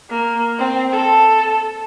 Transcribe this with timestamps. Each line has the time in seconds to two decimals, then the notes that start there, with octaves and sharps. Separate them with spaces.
0.10 A#3
0.59 C4
0.92 A4